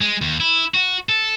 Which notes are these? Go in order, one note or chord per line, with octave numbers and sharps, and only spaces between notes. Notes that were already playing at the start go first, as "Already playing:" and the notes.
G#3
D#2
E4
F#4
A4